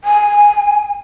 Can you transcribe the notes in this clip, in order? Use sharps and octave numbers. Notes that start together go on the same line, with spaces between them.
G#5